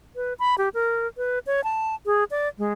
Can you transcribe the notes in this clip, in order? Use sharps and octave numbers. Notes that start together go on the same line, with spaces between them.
B4
B5
G4
A#4
B4
C#5
A5
G#4
D5
G#3